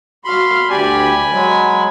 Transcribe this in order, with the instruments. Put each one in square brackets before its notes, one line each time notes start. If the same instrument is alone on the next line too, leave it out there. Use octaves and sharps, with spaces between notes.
[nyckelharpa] F#4 F5 [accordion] B5 C6
[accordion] D2 G4 D5 [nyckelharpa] G#5 B5
[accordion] F#3 G#3